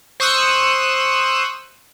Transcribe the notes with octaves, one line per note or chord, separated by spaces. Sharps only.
C5 C#6 D#6 E6 F#6